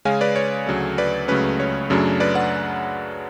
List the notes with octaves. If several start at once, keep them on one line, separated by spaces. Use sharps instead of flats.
C#3 G#3 C#4 F5 G#5
B4 D5
C#5
D2 C#3 F#3 A3
B4 D5
C#2 C#3 F#3 A3 C#4 B4
C#5
F#2 C#3 F#3 A3 D4
B4 D5
D5 F#5